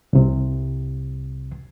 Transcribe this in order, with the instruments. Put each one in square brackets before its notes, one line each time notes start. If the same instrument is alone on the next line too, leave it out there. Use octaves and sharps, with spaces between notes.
[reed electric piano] C2 C3